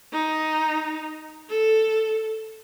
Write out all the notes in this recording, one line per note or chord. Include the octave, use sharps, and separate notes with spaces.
D#4
A4